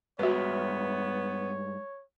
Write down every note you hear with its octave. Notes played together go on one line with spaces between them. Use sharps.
G2 G#3 B3 F#4 B4 C#5 E5